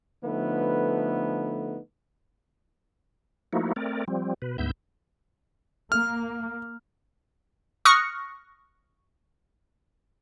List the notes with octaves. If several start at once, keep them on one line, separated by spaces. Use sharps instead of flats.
D3 F3 A3 B3 D#4 B4
F3 A3 A#3 D#4 E4 F#4
A3 C4 A#4 D5
F3 G3 C4
B2 B4
D2 G#2 B3 E5 G6
A#3 F6
C#6 D#6 F6 F#6 A#6 C#7